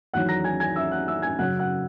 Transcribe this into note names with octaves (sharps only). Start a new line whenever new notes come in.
E2 D#3 F#3 F#5 F#6
A#5 A#6
G#5 G#6
G#5 G#6
E5 E6
F#5 F#6
E5 E6
G#5 G#6
F#2 C#3 F#3 F#5 F#6
F#5 F#6